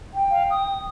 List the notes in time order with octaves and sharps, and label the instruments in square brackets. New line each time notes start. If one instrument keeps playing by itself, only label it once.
[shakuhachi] G5
[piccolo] F5
D#6